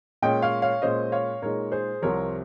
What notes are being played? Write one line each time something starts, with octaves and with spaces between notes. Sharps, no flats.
A#2 G#3 C#4 D#5 G5
C#5 F5
C#5 F5
A#2 G#3 C#4 C5 D#5
C#5 F5
A#2 G#3 D#4 A#4 C#5
G#4 C5
C2 C3 F3 A#4 C#5